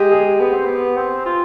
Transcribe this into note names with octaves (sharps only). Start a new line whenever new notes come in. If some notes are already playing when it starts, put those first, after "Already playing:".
Already playing: G#3 G4
G#4
B3
C4
B3
C4
F4